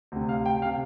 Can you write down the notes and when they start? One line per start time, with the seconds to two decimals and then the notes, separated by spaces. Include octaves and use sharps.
0.12 D2 C3
0.29 F5
0.46 G5
0.62 F5
0.65 C3